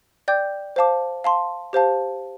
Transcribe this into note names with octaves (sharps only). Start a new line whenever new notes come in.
D5 G5 D6 G6
C5 F5 A5 D6
F5 A5 C6
G4 C5 F5 A5